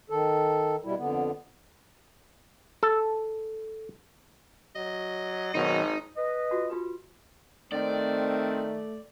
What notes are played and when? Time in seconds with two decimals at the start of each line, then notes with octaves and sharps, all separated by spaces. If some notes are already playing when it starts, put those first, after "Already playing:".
0.10 D#3 A4
0.84 B2 G3 E4
0.98 F2 D3 B3
2.83 A4
4.76 F#3 D#5
5.55 G#1 B2 D#3 F#3 D#4
6.16 B4 D#5
6.51 F4 F#4
6.70 F4 G4 B4
7.72 D#3 A3 C4 D5